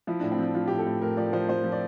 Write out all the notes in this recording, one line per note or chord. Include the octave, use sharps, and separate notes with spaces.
F3 E4
A2 D4
C4
F3 D4
F3 F4
A2 G4
A4
A2
A2 A#4
F3 D5
F3 C5
F3 C5
F3
D5